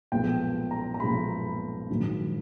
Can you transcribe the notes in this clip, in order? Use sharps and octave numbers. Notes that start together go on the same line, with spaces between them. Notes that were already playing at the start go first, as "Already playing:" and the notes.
B1 A#2 F3 G#3 B3 G5
A#5
A#5
B1 A#2 F3 G#3 B3 B5
A#1 G#2 D#3 F#3